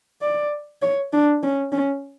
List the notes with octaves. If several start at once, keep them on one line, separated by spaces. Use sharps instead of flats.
D5
C#5
D4
C#4
C#4